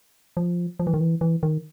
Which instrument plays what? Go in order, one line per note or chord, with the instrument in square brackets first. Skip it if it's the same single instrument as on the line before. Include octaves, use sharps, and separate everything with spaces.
[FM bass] F3
F3
E3
D#3
E3
E3
D#3